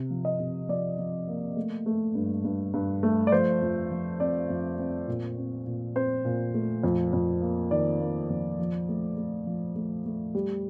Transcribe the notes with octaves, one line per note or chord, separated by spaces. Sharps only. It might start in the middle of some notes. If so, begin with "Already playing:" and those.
Already playing: C3
F3
D#5
C3
F3 D5
F3
A#3
A3
A3
G2
G2
G2
A3
D5
F3 C5
F2
F3
C4 D5
F2
C4
A#2
C4
A#2
C4 C5
A#2
A3
F2
F2
A#3
D#3 D5
A#3
F2
F3
A3
A3
F3
A3
A3
G3